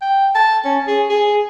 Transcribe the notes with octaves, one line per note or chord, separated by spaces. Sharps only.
G5
A5
C#4
G#4
G#4